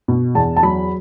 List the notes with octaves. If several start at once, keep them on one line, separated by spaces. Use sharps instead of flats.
B2
E2 A5
A5
F#3 B5